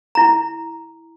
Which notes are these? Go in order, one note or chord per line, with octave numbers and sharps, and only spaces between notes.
E4 A#5